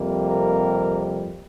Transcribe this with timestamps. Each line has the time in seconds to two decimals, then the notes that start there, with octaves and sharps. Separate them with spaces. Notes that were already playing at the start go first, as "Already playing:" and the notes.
Already playing: F2 C3 G3 A#3
0.29 A#4